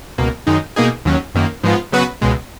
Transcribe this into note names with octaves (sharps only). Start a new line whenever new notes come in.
C#2 B2 A#3
F#2 D#3 G#3 D#4
B2 A#3 D#4 G#4
D#2 D#3 F#3 C#4
F#2 D#3 A#3
G#2 F3 G#3 B3 F4
C#3 F#3 B3 F#4 B4
C#2 B2 G#3